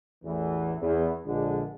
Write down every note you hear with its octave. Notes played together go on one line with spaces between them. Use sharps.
A1 E2 E3
E2
A#1 D3 G#3